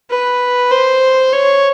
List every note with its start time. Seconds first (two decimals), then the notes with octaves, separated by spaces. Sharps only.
0.10 B4
0.71 C5
1.33 C#5